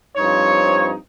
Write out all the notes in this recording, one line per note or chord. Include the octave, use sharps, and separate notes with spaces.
G2 F3 C4 D#4 C#5